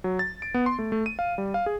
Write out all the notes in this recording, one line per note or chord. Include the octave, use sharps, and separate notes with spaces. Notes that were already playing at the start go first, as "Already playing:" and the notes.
F#3
A6
D7
B3
C6
A3
A3
D#7
F5
G3
F5
G#4